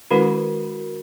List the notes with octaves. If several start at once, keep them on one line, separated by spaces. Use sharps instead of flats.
D#3 G#3 C#4 E4 F#4 A#4 B4